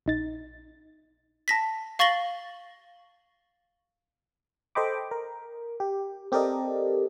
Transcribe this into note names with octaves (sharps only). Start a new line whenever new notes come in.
A#1 D#4 A6
A5 A#6 B6
F5 C#6 A6 A#6 F#7 G7
A4 C5 D#5 G5 B5 D6
A#4
G4
C4 G4 A4 A#4 D5 D#5